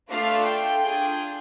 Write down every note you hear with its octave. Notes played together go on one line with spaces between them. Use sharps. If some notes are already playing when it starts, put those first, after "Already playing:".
A3 D4 F4 A4 F5
G5
D4 F4 G#4